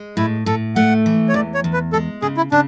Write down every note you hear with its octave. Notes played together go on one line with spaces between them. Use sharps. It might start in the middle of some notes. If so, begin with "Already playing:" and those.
Already playing: G#3
A2 E4
A2 A4
A3 F#5
E3
C#5
E2 D5
C#5
E2
B4
G#3 A4
C#3 G#4
E4
C#3 D4